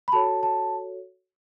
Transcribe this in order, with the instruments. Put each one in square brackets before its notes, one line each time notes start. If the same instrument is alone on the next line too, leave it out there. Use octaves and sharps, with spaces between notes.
[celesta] B5
F#4 A4 C#5 A5
A5